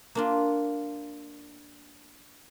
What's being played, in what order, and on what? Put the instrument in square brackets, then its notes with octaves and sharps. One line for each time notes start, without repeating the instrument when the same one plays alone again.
[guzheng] A#3 D4 F4